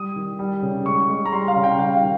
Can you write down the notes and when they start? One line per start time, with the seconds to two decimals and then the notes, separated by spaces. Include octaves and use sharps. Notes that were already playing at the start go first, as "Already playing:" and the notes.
Already playing: G3 D#6
0.16 D#3
0.39 G3
0.62 C#3
0.86 G#3 C#6
1.09 G#3
1.26 A#5
1.32 G3 C6
1.48 F5
1.56 C#3
1.63 G5
1.79 G3 F5
1.94 G5
2.02 D#3